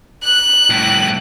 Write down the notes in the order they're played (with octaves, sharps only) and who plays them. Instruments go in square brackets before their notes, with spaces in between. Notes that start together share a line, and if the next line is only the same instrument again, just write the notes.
[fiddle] F#6 [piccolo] F#7
[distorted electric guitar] C2 A2